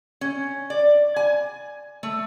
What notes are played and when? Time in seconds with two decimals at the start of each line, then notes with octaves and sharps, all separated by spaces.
0.21 C#4
0.70 D5
1.16 G#5
2.03 A3